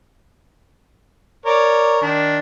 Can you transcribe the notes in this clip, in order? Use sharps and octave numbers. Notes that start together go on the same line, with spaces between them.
A#4 C#5 D5
D#3 D4